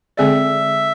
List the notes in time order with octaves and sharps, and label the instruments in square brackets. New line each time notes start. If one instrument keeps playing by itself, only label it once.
[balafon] D3 G#3 C4 G#4 D5 [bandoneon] E5